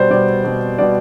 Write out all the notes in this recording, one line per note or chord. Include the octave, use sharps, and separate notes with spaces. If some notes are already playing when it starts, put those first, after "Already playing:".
Already playing: B2 G3 C5 D5
B2 G3 D5
B2 G3
B2 G3 D5